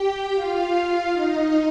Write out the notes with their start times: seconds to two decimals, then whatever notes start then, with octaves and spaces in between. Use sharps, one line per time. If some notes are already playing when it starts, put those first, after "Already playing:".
Already playing: G4 G5
0.34 F4 F5
1.13 D#4 D#5